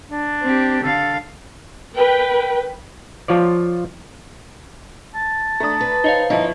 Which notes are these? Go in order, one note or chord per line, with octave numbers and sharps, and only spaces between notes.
D4
C4 G4
D3 A4 F5
A#4 B4 G5
F3 F4 C#5 D5
A5
A3 D4 A#5 D#6
B4
D#4 C5 C#5 F5
G1 F3 D#4 E4